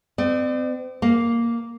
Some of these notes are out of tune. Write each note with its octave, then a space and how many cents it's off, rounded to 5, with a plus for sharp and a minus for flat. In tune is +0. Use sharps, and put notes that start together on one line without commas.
C4 -35 D5 +35
A#3 +0 F5 +0